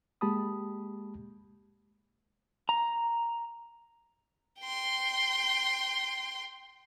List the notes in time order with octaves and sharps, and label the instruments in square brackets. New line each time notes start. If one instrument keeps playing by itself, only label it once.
[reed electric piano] G#3 A#3 G4 A5 B5 D#6
[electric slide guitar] A#5
[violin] G5 C6